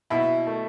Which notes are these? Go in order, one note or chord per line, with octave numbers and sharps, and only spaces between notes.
B2 E4
A3